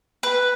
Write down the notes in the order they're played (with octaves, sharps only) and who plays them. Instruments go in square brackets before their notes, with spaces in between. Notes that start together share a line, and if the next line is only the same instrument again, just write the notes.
[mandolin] B4